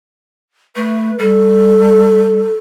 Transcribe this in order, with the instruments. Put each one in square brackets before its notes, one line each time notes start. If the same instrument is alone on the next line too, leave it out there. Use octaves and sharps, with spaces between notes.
[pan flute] A3 [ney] B4
[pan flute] G3 [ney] A4